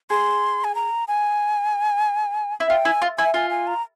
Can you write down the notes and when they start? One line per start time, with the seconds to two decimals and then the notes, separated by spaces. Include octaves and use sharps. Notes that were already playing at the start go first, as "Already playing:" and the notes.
0.10 G#4 C6
0.64 G#5
0.75 A#5
1.08 G#5
2.60 E4
2.70 F4 G5
2.85 E4 G#5
3.02 F4
3.18 E4 G#5
3.34 F4 G#5
3.50 G#5
3.67 A#5